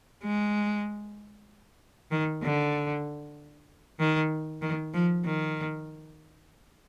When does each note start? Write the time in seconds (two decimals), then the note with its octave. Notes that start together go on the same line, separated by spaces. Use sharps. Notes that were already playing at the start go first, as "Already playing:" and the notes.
0.23 G#3
2.11 D#3
2.43 D3
3.99 D#3
4.62 D#3
4.94 F3
5.25 D#3